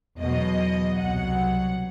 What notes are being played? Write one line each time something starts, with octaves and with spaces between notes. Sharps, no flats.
E2 B2 F#3 D#5
C2 B2 F#3 F#5